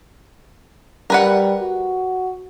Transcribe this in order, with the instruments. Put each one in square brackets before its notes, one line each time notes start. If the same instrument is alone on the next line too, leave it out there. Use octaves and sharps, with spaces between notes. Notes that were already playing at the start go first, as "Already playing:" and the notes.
[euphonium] G3 [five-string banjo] A#4 B4 F#5
[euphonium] F#4